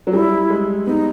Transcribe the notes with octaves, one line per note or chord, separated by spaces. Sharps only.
F#3
G3 E4
G#3
B3 D#4